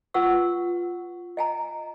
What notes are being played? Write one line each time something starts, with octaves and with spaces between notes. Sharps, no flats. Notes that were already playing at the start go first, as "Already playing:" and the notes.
F4 B4 F#5 C#6 E6
D#5 G#5 A#5